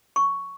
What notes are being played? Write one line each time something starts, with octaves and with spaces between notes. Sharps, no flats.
C#6